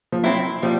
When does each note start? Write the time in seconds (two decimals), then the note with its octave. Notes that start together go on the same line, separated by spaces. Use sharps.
0.12 F3
0.23 F#3 C4 E4
0.62 F3 G3